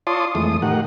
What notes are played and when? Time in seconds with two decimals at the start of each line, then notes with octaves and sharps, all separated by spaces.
0.07 F4 C#5 D5 A5 C6 D#6
0.35 F2 E3 G#3 A3 D#6
0.62 A2 D#3 G4 A#4 F#5